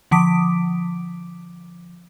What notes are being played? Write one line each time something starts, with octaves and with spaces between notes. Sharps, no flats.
D3 F3 D6 B6 D7